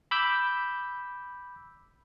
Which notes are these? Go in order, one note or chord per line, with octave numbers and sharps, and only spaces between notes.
B5 D6 E6 G6